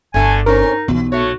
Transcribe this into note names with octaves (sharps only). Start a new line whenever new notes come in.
G1 D3 A3 A4 G#5
C4 C#4 D#4 A#4
B1 B2 E3
A3 F#4 C#5